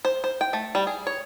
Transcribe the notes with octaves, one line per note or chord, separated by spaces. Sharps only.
C5
C5
G5
A3
G3
G#4
C#5